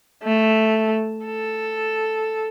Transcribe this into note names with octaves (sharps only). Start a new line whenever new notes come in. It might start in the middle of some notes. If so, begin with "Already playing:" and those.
A3
A4